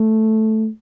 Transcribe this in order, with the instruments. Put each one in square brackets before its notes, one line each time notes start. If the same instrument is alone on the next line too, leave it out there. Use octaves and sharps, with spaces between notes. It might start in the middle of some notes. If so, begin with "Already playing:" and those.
Already playing: [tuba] A3